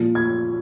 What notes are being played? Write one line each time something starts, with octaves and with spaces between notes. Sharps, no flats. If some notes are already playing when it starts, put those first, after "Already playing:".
Already playing: A#2 F3
G#6